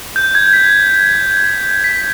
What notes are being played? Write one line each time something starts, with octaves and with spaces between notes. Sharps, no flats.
G6
G#6
B6
B6